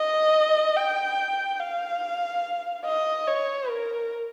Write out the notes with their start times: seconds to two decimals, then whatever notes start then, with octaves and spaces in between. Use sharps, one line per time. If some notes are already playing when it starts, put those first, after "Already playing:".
Already playing: D#5
0.77 G5
1.60 F5
2.86 D#5
3.27 C#5
3.70 A#4